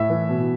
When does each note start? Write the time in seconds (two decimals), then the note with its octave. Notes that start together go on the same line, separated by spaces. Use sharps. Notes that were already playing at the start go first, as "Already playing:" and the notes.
Already playing: A2 E5
0.10 E3
0.29 B2